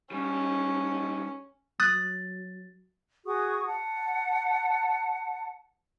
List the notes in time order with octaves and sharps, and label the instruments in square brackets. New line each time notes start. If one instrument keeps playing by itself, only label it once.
[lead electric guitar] G#2 G3 [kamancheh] C#4
[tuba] F#3 [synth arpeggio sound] D#6 F#6 [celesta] A6
[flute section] F#4 G#4 C#6 D#6
F#5 A5